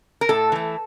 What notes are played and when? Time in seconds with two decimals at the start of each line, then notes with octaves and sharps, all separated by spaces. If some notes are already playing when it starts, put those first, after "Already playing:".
0.21 A#4
0.29 A2 A4
0.52 E3 A3